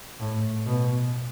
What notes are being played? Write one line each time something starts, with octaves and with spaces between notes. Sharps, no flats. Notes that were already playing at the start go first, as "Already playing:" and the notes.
A2
B2